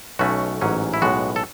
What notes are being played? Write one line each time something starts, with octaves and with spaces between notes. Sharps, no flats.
B1 B2 A3 C#4 F#4
A1 G#2 F#3 C#4
E4
B1 A2 G#3 B3 F#4
A4